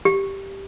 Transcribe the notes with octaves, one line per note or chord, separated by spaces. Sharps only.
G4